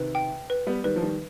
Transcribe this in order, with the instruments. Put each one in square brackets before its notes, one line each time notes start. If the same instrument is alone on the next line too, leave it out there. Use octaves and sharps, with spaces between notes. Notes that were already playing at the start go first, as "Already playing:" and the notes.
Already playing: [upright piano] C3 D#3 [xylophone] B4
[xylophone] G5
B4
[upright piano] G3 B3
[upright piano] D#3 G3 [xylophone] B4
[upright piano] F3
D#3 G3